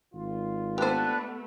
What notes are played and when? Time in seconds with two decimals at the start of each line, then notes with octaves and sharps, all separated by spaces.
0.15 G#1 F4
0.78 A3 B3 D4 G4 B4 C5